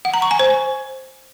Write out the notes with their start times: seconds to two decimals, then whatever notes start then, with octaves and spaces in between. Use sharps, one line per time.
0.05 F#5
0.14 A#5
0.22 C#6
0.31 G#5
0.39 C5